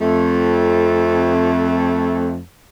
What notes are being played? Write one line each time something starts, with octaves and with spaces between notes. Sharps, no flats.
F2 A3